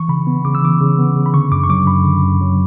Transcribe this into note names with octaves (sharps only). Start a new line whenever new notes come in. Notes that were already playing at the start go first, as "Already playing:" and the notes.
Already playing: E3 C#6
C#3 B5
B3
C#3 D6
E6
E3 D6
C#3
B3
C#3
B5
D3 C#6
F#2 D6
C#6
F#3 D6
F#2 B5
D3
F#2
F#3